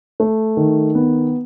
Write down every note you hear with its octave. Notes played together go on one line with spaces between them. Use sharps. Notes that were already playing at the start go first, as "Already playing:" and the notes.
A3
D#3
B3